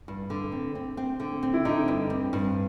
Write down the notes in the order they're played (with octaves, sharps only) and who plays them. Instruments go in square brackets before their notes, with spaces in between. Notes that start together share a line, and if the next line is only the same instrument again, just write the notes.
[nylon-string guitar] G2
D3
C4
C4
C4
D3
C4
[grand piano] E4
[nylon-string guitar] D3 [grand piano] D#4
[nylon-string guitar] G2
C4
G2